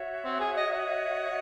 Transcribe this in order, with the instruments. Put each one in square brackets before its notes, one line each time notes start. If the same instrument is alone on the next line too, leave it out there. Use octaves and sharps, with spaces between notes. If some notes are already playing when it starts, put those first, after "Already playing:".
Already playing: [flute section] F#4 C#5 E5
[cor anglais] C4
G#4
D#5
D#5